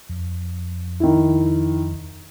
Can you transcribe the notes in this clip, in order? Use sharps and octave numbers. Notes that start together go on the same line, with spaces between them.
F2
D#3 E4